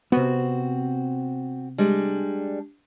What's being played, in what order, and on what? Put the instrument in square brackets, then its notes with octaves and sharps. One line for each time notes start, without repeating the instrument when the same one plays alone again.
[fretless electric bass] C3 B3 [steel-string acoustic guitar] C4 F#4
[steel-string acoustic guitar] G3 G#3 D4